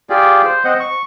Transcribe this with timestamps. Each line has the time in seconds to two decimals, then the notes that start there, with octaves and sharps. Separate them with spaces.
0.10 F4 G4 G#4 D5
0.45 C5
0.65 C4 C5 D#5 F#5
0.80 C#6